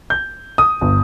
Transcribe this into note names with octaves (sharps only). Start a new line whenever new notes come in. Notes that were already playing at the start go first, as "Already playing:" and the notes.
G6
D#6
G1